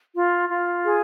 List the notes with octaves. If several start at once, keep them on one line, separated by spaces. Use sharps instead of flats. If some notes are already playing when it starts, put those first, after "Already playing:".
F4
F4
G#4